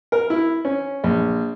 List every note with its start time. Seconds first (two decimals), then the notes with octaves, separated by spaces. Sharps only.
0.12 A#4
0.30 E4
0.65 C#4
1.04 A#1